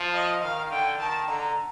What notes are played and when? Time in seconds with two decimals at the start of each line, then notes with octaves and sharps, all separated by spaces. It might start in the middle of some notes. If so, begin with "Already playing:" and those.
Already playing: F3
0.14 D#5
0.43 D#3 F5
0.71 D3 G5
0.99 D#3 A5
1.28 D3 A#5